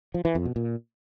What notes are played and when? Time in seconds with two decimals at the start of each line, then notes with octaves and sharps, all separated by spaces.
0.14 F3
0.25 E3
0.35 F2
0.45 B2
0.56 A#2